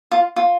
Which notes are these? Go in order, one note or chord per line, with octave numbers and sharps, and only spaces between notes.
F4
F4